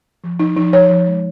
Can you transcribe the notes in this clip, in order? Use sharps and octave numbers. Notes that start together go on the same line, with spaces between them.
F3
F3 D#4
F3 D#4
F3 C#5
F3
G#3